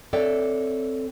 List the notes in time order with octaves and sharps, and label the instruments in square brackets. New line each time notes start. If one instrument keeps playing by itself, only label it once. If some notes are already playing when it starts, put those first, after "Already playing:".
[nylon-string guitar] C4 A4 C#5 D5 E5 G5